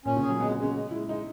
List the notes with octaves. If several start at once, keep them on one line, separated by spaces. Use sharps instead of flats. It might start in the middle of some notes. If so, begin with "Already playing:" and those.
A#2 C#4
C#3
G#4
F#3
G#3 B3
B3
G#3
C#4
G#3
G#3 E4
G#3 D#4